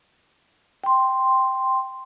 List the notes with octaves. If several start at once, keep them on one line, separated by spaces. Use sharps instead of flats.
G5 C6